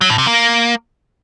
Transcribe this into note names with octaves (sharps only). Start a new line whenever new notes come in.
F#3
A2
C3
A#3